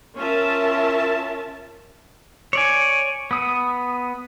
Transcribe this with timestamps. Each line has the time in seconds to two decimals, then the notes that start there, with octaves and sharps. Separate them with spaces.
0.16 C#4 F4 A#4 E5 A5
2.53 C#5 D5 G#5
3.31 B3 D#6